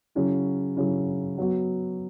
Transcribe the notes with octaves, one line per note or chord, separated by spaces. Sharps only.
C#3 F#3 C#4 E4
C#3 F#3 C#4 E4
F#3 B3 F#4